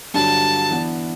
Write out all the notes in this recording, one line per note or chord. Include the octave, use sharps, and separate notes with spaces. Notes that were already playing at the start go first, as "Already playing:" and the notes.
G2 D3 F#3 A5
E3 B3 D4